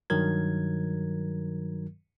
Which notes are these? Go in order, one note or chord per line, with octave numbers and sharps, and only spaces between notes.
G2 D#3 F#3 A#4 G#6